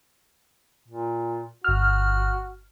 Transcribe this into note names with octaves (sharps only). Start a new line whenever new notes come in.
A#2
G1 F#4 F6